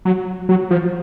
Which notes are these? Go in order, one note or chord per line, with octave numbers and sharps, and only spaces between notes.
F#3
F#3
F3